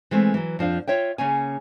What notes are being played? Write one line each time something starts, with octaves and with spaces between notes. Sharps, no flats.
E3 G#3 A3 C4
E3 F#3
F2 F3 D4 F5
F4 C#5 E5 G5
C#3 A#3 C#4 G#5